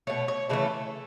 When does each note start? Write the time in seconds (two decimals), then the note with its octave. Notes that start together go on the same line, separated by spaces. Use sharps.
0.07 B2 A3 C#5
0.28 C#5
0.49 C#3 E3 A3 A4